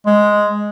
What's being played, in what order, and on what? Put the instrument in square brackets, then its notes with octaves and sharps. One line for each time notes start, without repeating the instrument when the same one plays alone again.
[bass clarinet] G#3